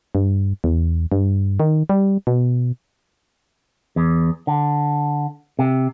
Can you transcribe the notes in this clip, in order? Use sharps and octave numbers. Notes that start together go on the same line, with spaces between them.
G2
E2
G2
D#3
G3
B2
E2
D3
C3